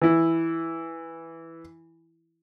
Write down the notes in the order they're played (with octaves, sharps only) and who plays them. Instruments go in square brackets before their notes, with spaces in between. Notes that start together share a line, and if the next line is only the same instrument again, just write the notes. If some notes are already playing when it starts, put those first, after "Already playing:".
[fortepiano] E3 E4